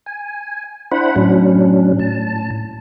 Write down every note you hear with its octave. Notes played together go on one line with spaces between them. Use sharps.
G#5
D4 E4 C5 F#5 B5
A2 F#3 C#4 D4
A2 A5